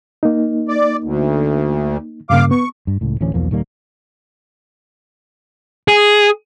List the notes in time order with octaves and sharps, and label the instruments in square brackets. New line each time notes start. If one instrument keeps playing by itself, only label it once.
[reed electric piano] A#3 D#4
[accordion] D5
D2
[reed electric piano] G2 C#3 A#3 [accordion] F5 D6
[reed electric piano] B3 [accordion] C#6
[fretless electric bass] G2
C#2 A2
D1 D2 E3 C#4
B1 E2 F3 A#3
D#1 D#3 G3 A#3
[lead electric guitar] G#4